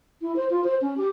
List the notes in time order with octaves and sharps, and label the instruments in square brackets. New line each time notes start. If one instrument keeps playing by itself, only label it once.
[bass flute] E4
C5
F4
C5
C#4
G4